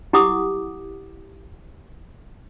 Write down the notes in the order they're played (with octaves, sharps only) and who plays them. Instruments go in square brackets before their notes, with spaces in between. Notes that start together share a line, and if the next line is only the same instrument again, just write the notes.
[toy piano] E4 G4 F#5 D6 D#6